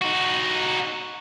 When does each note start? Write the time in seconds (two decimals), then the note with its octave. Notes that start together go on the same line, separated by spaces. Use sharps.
0.02 D#4 F#4